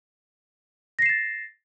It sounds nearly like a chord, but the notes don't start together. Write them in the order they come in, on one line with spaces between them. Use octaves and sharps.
A#6 C7 E7 A6